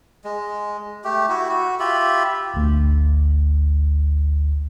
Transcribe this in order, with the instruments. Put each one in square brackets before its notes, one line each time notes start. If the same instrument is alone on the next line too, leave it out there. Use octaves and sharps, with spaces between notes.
[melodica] G#3
A3 G4
E4 F#4
F#4
F4 G4 E5 B5
[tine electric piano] G1 D2